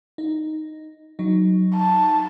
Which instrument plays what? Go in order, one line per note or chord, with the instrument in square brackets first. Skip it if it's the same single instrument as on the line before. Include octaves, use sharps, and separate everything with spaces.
[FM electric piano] D#4
F#3 D#4
[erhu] A5